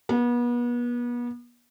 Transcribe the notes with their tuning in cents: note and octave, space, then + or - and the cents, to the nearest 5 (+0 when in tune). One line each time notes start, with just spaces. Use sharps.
B3 -35